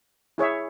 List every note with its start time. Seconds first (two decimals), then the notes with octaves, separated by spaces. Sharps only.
0.38 E4 G#4 C#5 E5